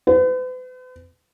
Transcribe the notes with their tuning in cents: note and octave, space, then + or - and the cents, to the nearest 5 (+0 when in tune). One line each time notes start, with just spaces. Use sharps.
B4 +45